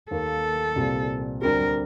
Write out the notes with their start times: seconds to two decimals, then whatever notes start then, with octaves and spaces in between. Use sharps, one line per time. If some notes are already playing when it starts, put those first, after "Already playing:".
0.11 D#2 D#3 A#3 A4
0.76 C2 A#2 G3 C4 F4
1.42 D2 D3 G3 C4 G4 A#4